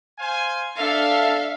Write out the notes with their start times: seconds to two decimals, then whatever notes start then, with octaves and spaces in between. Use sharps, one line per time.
0.18 C5 F5 G#5
0.78 D4 A4 E5 F5